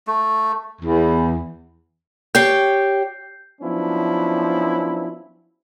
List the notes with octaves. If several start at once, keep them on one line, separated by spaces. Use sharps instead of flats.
A3
E2
G4 C#5 G5 G6 C7
F3 F#3 B3 C#4 D4 E4